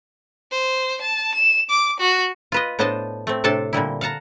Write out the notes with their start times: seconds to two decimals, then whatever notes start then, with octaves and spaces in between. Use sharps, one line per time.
0.52 C5
1.01 A5
1.35 E7
1.70 D6
2.00 F#4
2.52 F4 B4 D#5
2.79 A2 B3 D4 C5 D#5 A5
3.27 A3 C4
3.44 A2 C3 D4 A4 A5
3.73 A#2 D3 G3 E4
4.01 F5 F#5 A5 A#5